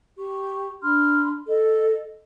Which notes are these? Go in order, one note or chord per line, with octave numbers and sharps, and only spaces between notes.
G4 C#6
D4 B5 C6 F6
A4 D#5